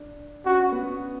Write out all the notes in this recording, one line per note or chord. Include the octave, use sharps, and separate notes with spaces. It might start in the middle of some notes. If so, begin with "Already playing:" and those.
Already playing: D4
C#4 F#4
B3